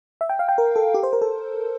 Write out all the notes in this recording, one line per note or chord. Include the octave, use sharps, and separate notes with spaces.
E5
G5
F5
G5
A#4
A4
G4
C5
A#4
A4